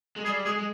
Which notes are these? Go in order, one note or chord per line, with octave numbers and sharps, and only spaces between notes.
G#3
G3 G#4
G#3 G#4
G#3